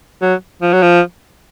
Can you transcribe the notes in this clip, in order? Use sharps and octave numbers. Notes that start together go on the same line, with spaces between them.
F#3
F3
F#3
F3